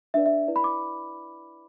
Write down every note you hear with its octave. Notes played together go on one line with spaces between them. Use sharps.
D4 B4 D5 E5
E5
E4 B4 D5
B5
D6